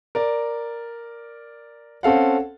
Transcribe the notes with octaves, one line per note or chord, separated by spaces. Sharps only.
A#4 D5
C4 C#4 A4 F5 F#5